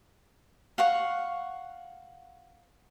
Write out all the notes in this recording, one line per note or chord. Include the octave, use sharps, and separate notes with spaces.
F5 F#5 C#6